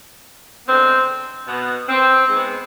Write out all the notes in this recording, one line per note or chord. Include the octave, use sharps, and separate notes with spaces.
D3 G#3 B3 C4
B2 B3
C4
G#2 G#3 B3